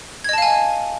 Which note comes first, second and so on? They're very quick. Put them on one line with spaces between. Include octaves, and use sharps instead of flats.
G#6 D#5 A5 F5 G#5